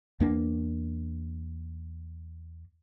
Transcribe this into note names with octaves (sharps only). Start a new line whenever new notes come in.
E2 A#3 D4